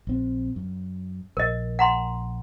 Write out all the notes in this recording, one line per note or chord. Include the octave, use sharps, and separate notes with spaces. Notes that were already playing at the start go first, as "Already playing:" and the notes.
A#1 C4
F#2
A#1 A#4 D#5
F#5 A#5 C6